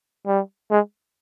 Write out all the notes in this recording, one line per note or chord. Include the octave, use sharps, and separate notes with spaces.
G3
G#3